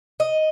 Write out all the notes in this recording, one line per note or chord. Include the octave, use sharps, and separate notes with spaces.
D#5